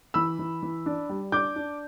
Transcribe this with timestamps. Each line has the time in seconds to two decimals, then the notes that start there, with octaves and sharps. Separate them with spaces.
0.14 E3 B5 E6
0.39 E3
0.62 E3
0.86 D4
1.09 G3
1.32 D4 D6 G6
1.56 D4